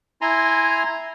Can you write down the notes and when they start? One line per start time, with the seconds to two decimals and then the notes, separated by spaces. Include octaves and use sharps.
0.22 E4 G#5 A#5 C6